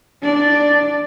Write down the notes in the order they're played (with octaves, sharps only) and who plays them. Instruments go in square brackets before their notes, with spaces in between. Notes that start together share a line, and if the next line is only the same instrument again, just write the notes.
[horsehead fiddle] D4 D5